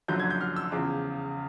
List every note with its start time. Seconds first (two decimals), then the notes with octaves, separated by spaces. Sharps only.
0.08 F#1 F2 D3 F#3 G6
0.20 G#6
0.30 G6
0.41 F6
0.56 E6
0.72 E2 C#3 F3 D6